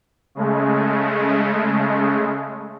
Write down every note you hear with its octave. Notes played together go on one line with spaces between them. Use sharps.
C#3 G#3 A3